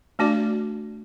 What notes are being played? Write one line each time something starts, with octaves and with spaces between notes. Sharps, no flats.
A3 D4 F#4 D5